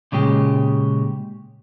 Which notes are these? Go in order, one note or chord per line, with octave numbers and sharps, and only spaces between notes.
A#2 C#3 G#3 G4